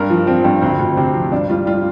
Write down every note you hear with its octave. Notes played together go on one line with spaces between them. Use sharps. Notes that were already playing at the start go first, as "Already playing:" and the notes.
Already playing: G2 G3 A#4
F3 F4
F3 C4
G2 C4
D2 C4
D2
C3 C4
F3
G2 D4
G3 F4
G3 F4